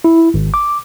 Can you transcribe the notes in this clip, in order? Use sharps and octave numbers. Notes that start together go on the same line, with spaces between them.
E4
G#1
D6